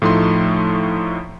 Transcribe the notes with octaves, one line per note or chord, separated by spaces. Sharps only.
A2 F3 A3 D#4 C6